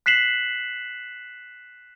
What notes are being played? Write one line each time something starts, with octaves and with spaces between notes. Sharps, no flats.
F#6 B6 C7 E7 F#7